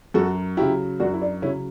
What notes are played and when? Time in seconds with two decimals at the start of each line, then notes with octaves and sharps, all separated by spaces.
0.14 F#2 F#4 A4
0.57 C#3 F#3 E4 G4
1.00 F#2 D4 F#4
1.14 E4
1.22 D4
1.42 C#3 C#4 E4
1.46 F#3